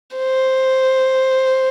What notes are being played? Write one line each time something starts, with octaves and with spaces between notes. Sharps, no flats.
C5